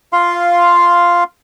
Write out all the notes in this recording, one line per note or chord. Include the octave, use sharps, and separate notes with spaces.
F4 F5 C6